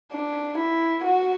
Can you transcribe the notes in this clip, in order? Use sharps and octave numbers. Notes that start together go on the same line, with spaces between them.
D4
E4
F#4